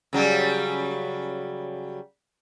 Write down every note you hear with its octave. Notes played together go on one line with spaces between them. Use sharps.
C#3 F#3 G3